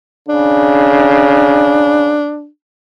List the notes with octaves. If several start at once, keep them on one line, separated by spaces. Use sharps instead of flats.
C#3 D4